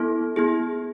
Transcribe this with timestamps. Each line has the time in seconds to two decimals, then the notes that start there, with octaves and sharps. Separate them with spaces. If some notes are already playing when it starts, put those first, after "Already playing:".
Already playing: B3 E4 A4
0.36 B3 E4 G#4